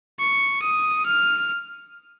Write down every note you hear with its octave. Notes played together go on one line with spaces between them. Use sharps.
C#6
D#6
F6